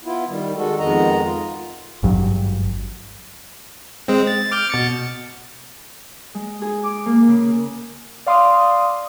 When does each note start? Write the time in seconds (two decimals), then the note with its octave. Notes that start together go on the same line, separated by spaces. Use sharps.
0.05 B3 E4 F4
0.28 D#3 G3
0.56 D#3 G#3 F#4 A4
0.79 F2 D#3 G#3 B3 D#5 A#5
1.22 F4
2.03 G#1 G2 F#3
4.08 G#3 C4
4.27 A6
4.51 D6 F6 G6
4.70 B2 A6 C#7
6.34 G#3
6.62 G#4
6.84 D6
7.06 A#3
7.28 C#3
8.26 D5 F5 C6 D6 D#6